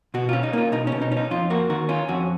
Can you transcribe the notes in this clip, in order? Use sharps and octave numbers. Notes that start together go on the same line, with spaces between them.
B2 F#4
C#4 F4
D#4
A#3 F4
B2 D#4
B2 C#4
D#4
C#4
D#4
F2 F4
A#3 F#4
D#3 F#4
C#4 F4
F2 F#4